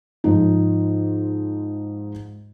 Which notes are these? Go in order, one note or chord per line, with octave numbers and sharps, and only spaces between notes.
G#2 F3 D#4